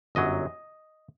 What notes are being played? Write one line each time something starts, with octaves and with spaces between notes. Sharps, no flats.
G1 F#2 F#3 D#5